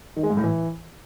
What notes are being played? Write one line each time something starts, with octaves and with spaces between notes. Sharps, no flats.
D#3
G#3
G#2
A2
E3